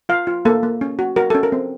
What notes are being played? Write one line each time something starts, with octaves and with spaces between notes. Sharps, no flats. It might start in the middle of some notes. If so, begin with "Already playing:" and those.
F4 F5
F4
A#3 A4
A#3
C#4
F#4
F#4 A#4
C#4 A4
A#4
C4